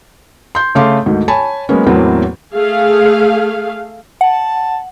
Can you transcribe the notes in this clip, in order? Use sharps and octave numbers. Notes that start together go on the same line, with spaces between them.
C6 G6
C#3 A3 F5 C6 D6
D2 G#2 D#3
C#5 G#5 A5 B5
F#3 G#3 A#3 B3 C#4
E2 A2 E3 F#3 A#3 C4
A3 G#4 F5
F#5 A5